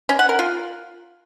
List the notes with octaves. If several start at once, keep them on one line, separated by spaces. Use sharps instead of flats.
C#4
F#5
A#4
F4